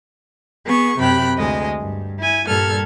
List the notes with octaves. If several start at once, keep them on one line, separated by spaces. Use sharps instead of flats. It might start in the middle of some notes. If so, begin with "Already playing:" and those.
B3 G#4 C#6
F#2 C3 G4 G5 B5 F#6
D2 G#3 D#5
G2
E4 G#5
G2 A#2 G3 A4 F6 G#6